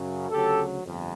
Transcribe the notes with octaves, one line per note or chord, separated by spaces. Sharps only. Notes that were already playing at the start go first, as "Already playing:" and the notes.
Already playing: F#2 C#3 F#3
D2 C#3 F#3 G4 A4
G1 F2